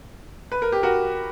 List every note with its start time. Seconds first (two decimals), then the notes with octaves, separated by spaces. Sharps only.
0.52 B4
0.62 A#4
0.72 G4
0.83 F#4 A#4